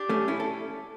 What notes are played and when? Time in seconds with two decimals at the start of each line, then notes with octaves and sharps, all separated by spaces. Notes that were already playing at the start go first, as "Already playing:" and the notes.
Already playing: D4 G4
0.09 A3 C#4
0.28 C#4 E4
0.40 A4